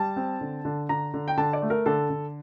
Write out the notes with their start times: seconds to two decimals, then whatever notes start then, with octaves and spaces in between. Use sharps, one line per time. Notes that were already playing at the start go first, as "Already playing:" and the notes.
Already playing: G3 A5
0.16 C4
0.41 D3
0.65 D3
0.89 D3 A#5
1.14 D3
1.28 G5
1.37 D3 A5
1.53 D5
1.62 A3
1.70 A#4
1.86 D3 A4
2.10 D3